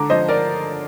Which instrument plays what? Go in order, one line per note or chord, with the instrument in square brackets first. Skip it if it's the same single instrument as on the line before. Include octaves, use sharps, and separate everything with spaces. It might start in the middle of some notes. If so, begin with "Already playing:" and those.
Already playing: [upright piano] D3 A#5 D6
F3 C5 D#5
A#4 D5